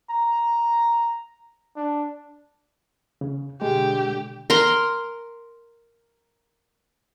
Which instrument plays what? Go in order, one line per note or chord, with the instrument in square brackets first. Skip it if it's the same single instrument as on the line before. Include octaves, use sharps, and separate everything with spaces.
[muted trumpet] A#5
D4
[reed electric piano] C#3
[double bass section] B2 D3 [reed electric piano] G#3 [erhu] G4
[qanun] A#4 A#5 C6